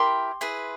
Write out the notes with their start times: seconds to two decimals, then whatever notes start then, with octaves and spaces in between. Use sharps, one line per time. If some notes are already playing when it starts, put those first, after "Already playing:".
Already playing: E4 G4 A#4 C6 D6
0.41 E4 G#4 B4